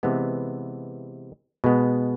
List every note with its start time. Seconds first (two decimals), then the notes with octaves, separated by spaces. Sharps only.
0.03 C3 E3 G#3 B3
1.64 B2 G#3 B3